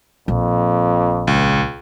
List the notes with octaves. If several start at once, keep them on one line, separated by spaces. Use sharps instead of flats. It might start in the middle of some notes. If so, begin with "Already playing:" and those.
A#1 F2
C#2